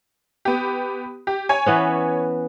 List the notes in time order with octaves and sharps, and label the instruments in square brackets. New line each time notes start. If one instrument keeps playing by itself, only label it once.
[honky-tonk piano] B3 G4
G4
C#5 G#5
[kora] E3 B3 C#4